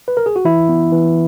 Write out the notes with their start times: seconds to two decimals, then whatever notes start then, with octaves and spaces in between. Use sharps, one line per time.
0.08 B4
0.17 A#4
0.26 G#4
0.36 F#4
0.45 E3 E4
0.69 B3
0.92 E3